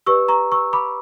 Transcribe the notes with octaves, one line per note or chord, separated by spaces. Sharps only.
G4 B4 D5 C#6 E6
A#5 C#6
C#6 E6
B5 D6